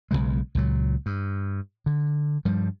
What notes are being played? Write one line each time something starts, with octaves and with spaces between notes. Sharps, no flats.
B1 E2 C#3 G#3
C#2 A#2 F#3
G2
D3
G2 F3 G3